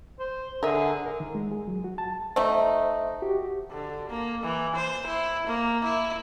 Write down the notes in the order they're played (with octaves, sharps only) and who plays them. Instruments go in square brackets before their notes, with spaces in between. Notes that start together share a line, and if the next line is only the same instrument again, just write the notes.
[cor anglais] C5
[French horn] D3 [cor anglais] G#4 [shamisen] A#4 E5
[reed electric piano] A#4
D#3
G#3
G#4
F#3
F#4
A5
[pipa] A3 D#4 [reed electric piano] C5 E5
[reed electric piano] F#4 G4
[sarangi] D3
A#3
E3
C5
E4
A#3
E4